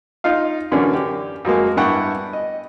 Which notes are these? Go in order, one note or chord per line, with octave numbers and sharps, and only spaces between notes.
D#4 F4 F5
F#2 D3 E3 A#3 C#4 D5
G4
F2 F#3 G#3 A#3
G2 B3 E4 F#5 G5 C#6
D#5